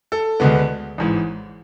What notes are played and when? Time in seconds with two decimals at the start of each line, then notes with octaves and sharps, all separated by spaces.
0.12 A4
0.40 D2 D3 G#3 B3
0.98 A1 G#2 E3